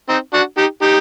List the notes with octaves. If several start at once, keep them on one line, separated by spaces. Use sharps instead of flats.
C4 D#4
D4 F#4
D#4 G4
D#4 G4